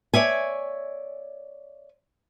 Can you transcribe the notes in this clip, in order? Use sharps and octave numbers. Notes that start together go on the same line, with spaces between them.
C#5 D5 E5 G#5